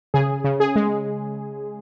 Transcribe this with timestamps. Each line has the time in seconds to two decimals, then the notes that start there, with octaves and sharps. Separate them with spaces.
0.14 C#3 G#4
0.44 C#3
0.60 G#4
0.76 G#3